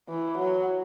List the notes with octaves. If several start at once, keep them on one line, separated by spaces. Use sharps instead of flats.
E3
F#3